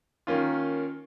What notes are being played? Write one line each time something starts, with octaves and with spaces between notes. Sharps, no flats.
D#3 A#3 C#4 F4